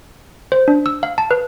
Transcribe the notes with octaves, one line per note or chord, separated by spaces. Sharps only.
C5
D4
E6
F5
A5
B4